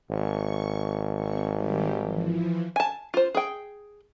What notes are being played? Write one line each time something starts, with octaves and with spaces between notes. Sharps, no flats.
G#1 C#6
C4 C#6
D#3 G3 G4
E3 F3
G#5 A5
F4 C5
G#4 G5